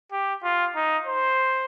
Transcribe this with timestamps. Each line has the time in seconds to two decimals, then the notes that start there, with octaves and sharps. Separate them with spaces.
0.12 G4
0.43 F4
0.76 D#4
1.07 C5